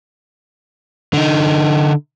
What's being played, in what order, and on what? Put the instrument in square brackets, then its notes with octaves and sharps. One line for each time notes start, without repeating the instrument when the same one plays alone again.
[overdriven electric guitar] D3 D#4